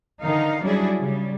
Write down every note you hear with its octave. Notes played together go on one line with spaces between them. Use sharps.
D3 D#3 D#4 F5
F#3 G3 C#4 D4 E4 G#4
C#3 G3